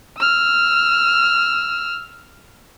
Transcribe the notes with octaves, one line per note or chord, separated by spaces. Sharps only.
E6 F6